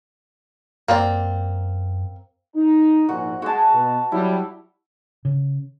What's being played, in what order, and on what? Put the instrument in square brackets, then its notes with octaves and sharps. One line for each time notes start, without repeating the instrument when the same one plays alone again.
[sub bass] F#2 [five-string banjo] A#3 C4 D5
[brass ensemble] D#4
[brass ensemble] A#1 G#2 [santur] F#4
[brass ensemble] G#3 [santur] F#4 A5
[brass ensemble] B2
[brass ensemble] F#3 G3 [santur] E4
[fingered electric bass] C#3